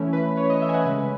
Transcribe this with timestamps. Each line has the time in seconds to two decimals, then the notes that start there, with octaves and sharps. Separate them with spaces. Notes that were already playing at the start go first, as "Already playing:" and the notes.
Already playing: E3 A3 C#4 E4
0.13 B4
0.37 C#5
0.50 D#5
0.62 E5
0.69 G#5
0.74 F#5
0.85 C#3 G#3 C#4 B4
0.98 B4